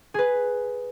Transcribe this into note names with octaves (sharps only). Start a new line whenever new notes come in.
G#4 B4